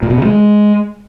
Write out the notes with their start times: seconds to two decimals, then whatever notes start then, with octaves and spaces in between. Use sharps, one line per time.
0.03 A#2
0.10 B2
0.18 C#3
0.25 G#3